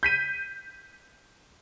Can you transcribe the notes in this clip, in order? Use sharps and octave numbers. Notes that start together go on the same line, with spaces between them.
G6 B6 D#7